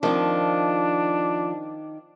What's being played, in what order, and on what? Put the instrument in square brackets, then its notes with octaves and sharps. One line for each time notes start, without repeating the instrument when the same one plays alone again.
[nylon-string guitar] D#3 C4 D#4 [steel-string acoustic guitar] F3 [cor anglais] D4